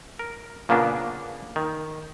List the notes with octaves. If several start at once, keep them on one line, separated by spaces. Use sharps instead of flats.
A#4
A#2 C#3 F3 A#3 B3 D4
D#3